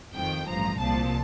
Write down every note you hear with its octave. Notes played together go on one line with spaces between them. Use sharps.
F2 D#3 G5
A1 G2 F3 A#5
C2 A#2 F3 A5